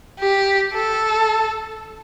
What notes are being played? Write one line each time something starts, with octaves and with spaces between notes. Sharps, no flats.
G4
A4